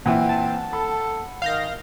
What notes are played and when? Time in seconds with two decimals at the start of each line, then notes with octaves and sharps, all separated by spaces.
0.06 A#2 E3 C4 F#5
0.29 A5
0.73 A4 B5
1.42 D#3 F5 G6 A#6